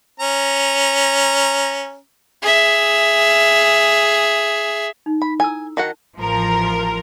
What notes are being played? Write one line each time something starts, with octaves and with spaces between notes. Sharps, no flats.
C#4 A#5
G#4 E5
D#4
B5
E4 A4 G#5 E6
D#3 F#4 F#5 A5
A1 F3 A#4